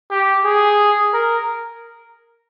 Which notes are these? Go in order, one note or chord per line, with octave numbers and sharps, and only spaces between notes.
G4
G#4
A#4